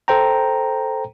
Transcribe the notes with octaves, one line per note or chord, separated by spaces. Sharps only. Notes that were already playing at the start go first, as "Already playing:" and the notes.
A4 C5 G5 A#5